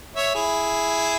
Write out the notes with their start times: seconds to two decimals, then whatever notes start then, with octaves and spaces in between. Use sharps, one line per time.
0.16 C#5 E5
0.35 E4 G#4